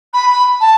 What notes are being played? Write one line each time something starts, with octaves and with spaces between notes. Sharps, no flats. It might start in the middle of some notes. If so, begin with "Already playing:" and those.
B5
B5
A5